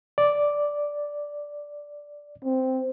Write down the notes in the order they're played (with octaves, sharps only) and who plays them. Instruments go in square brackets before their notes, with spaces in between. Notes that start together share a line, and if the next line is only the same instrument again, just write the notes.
[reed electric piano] D5
[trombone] C4